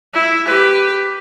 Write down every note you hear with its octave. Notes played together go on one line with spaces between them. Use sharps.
E4
G4 B4